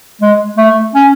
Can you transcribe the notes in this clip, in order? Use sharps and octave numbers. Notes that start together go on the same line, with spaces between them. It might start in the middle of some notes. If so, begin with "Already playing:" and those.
G#3
A3
C#4